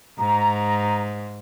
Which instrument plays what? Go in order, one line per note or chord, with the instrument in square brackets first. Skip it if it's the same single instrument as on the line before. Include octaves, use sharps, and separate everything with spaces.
[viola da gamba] G#2 [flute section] A#5